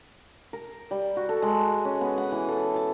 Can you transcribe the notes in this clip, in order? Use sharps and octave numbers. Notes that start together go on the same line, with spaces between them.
A#4
G3
F#4
A4
G#3
C#4
B3
F#5
E3
A4
A5